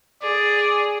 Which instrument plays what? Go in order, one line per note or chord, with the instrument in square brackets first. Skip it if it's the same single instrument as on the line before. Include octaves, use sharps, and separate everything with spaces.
[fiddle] G#4 [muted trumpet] D5